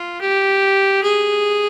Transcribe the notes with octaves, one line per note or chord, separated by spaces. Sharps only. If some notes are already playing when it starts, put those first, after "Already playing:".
Already playing: F4
G4
G#4